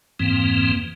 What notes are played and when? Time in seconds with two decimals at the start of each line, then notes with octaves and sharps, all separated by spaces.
0.19 F2 G#2 E3 A#3 C4